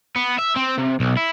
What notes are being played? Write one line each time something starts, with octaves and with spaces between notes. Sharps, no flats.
B3
E5
C4
C3
B1
E4